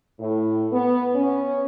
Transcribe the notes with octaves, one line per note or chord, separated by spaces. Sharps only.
A2
B3
C#4